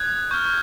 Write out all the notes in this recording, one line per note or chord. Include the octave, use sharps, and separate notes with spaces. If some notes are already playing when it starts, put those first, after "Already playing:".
Already playing: D#6 F#6 G#6
C#6 F6 G6